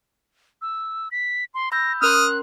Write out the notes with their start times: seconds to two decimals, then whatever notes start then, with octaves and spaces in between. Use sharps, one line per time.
0.62 E6
1.11 B6
1.54 C6
1.72 B5 E6 G6 A#6
2.02 C#4 A#4 C6 D#6 F6 F#6